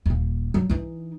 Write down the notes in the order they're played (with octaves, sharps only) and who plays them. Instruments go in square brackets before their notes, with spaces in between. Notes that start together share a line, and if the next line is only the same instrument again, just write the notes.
[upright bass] D#1 A#3
F#3
E3 D#4